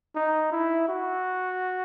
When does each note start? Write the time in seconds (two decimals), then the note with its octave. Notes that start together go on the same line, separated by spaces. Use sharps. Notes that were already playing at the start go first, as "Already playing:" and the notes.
0.15 D#4
0.52 E4
0.88 F#4